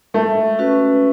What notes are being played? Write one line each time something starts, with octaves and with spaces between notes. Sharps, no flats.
G#3 A3
C#4 F#4 B4